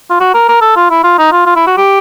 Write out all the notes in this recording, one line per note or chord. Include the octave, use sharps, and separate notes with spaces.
F4
F#4
A#4
A#4
A4
F4
E4
F4
D#4
F4
F4
E4
F#4
G4